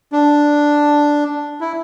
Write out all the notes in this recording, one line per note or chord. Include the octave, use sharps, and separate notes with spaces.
D4
E4